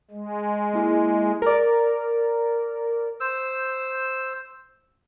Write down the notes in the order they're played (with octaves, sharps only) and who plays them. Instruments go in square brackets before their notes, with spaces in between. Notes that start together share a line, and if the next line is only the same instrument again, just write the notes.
[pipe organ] G#3
[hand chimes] A#3 E4 G#4
[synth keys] A#4 D5
[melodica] C5 E6